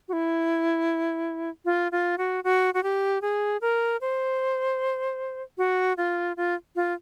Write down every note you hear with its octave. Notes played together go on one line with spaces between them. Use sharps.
F#4
E4
F4
F4
F#4
F#4
F#4
G4
G#4
A#4
C5
F#4
F4
F4
F4